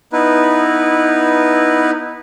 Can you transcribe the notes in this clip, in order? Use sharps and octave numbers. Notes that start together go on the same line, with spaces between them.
B3 D#4 E4 B4